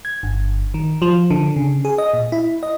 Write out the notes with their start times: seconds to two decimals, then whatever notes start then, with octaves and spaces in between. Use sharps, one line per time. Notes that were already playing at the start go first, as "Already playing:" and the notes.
0.05 G#6
0.23 G1
0.74 D#3
1.02 F3
1.30 D3
1.56 C#3
1.85 G#4
1.98 D#5
2.14 A#2
2.32 E4
2.63 D#5